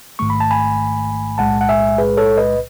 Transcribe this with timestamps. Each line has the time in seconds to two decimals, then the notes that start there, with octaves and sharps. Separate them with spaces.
0.19 A1 G#2 D#3 A3 C#6
0.30 B5
0.40 A5
0.51 G#5 B5
1.38 B1 A2 G#3 F#5 A5
1.61 F#5
1.69 E5 G#5
1.98 G#4 B4
2.17 A4 C#5
2.37 B4 D#5